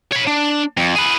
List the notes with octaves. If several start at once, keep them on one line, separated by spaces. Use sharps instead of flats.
C#5 B5
D4
F2
G#4 B4